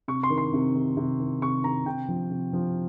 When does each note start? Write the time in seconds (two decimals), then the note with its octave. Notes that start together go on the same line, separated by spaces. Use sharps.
0.08 C3 C#6
0.23 C6
0.30 D#3
0.38 C6
0.53 C3
0.74 D#3
0.97 C3
1.19 D#3
1.42 C3 C#6
1.63 D#3 A#5
1.86 C3 G5
2.08 F3
2.31 C3
2.53 F3